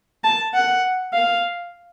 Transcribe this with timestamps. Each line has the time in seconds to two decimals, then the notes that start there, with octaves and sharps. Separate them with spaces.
0.24 A5
0.54 F#5
1.14 F5